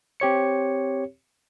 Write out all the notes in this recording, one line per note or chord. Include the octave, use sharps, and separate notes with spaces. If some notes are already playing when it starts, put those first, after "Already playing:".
C4 G4 C#5 C#7